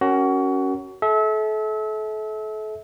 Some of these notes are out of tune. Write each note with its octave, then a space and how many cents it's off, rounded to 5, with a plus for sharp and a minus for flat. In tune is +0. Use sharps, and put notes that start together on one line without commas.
C#4 +0 F#4 +25 A#4 +0
A4 -35 E5 -30